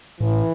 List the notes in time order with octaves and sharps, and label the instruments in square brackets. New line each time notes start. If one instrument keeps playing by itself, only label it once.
[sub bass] A2 [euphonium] E3